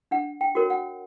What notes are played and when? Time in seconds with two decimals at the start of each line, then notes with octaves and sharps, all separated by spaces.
0.11 D4 F#5
0.41 G5
0.55 F#4 A#4 C#5
0.70 F#5